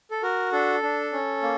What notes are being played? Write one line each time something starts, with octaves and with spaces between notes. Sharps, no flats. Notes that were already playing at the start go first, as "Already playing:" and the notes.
A4
F#4 A#4
D4 A4
D4
C#4
A#3